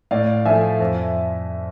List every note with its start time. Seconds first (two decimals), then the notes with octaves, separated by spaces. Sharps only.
0.11 A2 D5 F5
0.45 F3 A3 E5 G#5
0.80 F2